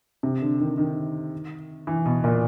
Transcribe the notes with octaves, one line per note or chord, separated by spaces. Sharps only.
C3
D3
D#3
D#3
E3
B2
A#2